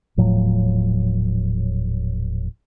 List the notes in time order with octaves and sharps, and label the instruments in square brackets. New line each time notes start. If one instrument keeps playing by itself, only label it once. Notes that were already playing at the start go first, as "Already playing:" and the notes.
[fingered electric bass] D#1 A2 F3 F#3